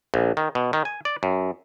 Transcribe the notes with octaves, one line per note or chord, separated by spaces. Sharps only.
A#1
D#3
B2
D#3
G#5
D5
F#2